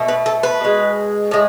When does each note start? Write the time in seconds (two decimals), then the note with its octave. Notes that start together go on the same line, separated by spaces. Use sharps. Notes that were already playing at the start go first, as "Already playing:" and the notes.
Already playing: B2 A3
0.08 B4
0.26 A4
0.43 B4
0.60 B2 G#3
1.31 A2 G#3